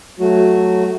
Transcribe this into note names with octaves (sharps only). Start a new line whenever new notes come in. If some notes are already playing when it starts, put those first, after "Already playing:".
F#3 A3 F#4